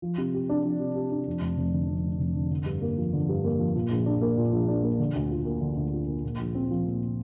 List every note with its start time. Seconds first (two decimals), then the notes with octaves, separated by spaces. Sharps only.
0.02 F3
0.18 C3
0.34 G4
0.49 D4
0.64 F3
0.80 C3
0.95 G4
1.11 D4
1.27 F2
1.42 F1
1.58 F1
1.73 D3
1.89 F2
2.04 F1
2.20 F1
2.36 D3
2.51 D3
2.66 G2
2.82 A#3
2.98 F3
3.13 D3
3.29 G2
3.44 A#3
3.59 F3
3.76 A#2
3.91 A#1
4.06 D4
4.21 A#3
4.38 A#2
4.52 A#1
4.68 D4
4.83 A#3
4.99 D3
5.15 D2
5.31 F4
5.45 A#3
5.61 D3
5.77 D2
5.93 F4
6.07 A#3
6.24 A#2
6.39 A#1
6.55 C4
6.71 F3
6.86 A#2